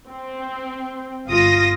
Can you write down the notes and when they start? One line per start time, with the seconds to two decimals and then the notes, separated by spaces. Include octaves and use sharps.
0.10 C4
1.28 G1 F4 D#6 A#6